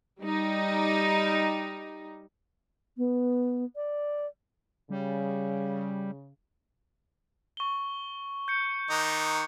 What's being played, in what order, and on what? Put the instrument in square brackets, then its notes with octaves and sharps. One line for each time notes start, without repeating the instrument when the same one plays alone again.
[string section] G3 D#4
[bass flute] B3
D5
[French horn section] C#3 [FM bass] G3
[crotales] C#6 G7
G6 C#7
[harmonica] D#3 D#4 [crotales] D6 F#6 G6